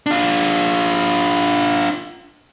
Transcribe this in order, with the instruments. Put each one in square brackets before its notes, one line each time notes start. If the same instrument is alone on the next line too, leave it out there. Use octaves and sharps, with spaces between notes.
[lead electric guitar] D4 F4